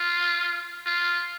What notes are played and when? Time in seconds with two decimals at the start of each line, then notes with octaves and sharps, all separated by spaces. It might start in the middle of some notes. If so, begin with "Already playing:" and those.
Already playing: F4
0.86 F4